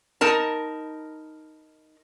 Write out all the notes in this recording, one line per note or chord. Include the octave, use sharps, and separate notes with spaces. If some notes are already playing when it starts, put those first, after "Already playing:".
D#4 A#4 A5